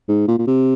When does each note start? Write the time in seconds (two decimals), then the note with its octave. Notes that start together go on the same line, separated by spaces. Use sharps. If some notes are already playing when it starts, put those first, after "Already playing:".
0.08 G#2
0.28 A#2
0.39 A#2
0.47 C3